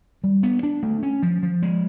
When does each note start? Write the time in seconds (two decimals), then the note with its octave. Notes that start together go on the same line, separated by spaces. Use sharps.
0.24 G3
0.43 B3
0.63 D4
0.83 A3
1.03 C#4
1.22 F3
1.43 F3
1.63 G#3